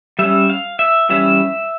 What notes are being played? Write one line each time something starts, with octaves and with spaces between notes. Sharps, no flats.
G3 C#4 E5
F5
E5
E3 G3 C#4 E5